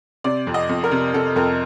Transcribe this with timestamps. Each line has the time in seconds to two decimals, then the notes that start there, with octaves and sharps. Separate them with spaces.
0.24 C3 D5
0.47 F2
0.54 D#5
0.69 F2
0.84 A#4
0.91 C3
1.14 C3 A4
1.36 F2 A#4